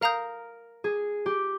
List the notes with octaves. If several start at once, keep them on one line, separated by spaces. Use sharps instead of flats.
A#4 F5 A#5 D#6 G6
G#4
G4